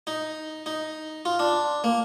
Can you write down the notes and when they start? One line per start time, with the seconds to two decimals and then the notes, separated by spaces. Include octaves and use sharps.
0.07 D#4
0.66 D#4
1.25 F4
1.39 D4
1.84 A#3